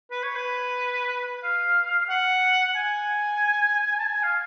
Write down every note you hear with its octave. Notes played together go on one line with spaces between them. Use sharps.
B4
C#5
B4
F5
F#5
G#5
A5
G#5
F5